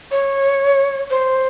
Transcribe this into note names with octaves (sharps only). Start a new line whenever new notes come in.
C#5
C5